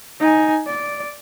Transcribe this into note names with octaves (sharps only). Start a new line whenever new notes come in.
D#4 G#5
D5